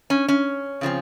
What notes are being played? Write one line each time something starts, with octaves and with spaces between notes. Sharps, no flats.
C#4
C#4
C#3 F3 A3 C4